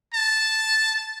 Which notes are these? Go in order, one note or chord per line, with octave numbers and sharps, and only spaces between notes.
A5